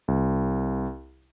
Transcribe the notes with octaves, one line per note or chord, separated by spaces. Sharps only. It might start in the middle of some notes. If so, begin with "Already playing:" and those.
C2